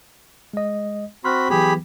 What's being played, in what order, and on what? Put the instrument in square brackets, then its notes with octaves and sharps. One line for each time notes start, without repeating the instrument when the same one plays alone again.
[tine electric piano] G#3 D#5
[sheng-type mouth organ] C4 F#4 B5 [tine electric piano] C6 F6 F#6
[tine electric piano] E3 F#3 B3 [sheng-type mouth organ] G4 G#4 B5